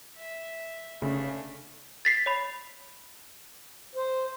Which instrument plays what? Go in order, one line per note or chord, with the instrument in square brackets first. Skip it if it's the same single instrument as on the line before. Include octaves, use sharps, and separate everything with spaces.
[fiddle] E5
[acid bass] F1 [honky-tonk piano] C#3 [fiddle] A3 D4
[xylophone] A6 B6 C7
C#5 B5
[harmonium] C5